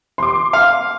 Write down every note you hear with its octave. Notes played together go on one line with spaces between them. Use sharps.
C6 D6
F5